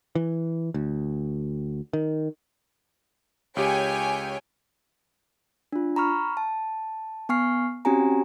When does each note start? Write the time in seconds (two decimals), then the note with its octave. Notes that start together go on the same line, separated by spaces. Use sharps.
0.15 E3
0.74 D2
1.93 D#3
3.56 C#2 G4 C#5 G5 G#5
5.72 D4 F4
5.96 A#5 B5 C#6 F6
6.37 A5
7.29 B3 G#5 C#6 F6 C7
7.85 C4 C#4 F#4 G4 G#5 A#5